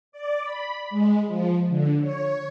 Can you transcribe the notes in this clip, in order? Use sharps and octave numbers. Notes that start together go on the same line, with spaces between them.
D5
B5
G#3
F3
D3
C#5